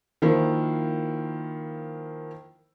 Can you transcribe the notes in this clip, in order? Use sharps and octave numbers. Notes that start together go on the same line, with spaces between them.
D#3 F3 A#3 E4 F4 C5